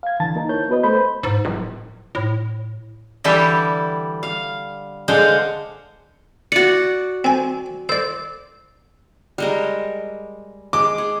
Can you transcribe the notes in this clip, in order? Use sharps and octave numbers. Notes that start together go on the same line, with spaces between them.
F5 G#6
C2 D3 E3 A5 A6
A#3 D#4 A#4
E4 C#5 G6
B3 F#4 B4 D#5
A3 A4 C5 B5 G6
G#2
D1
A2
D3 E3 G3 E4 G4 A4
F5
D3 G#3 C5 F5 F#5
F#4 D5 C#7
C4 G#5
C5 D5 E6
G3 G#3 A#4
G#3 D6
G#4